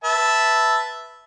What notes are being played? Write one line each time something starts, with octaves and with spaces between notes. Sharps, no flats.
B4 E5 A5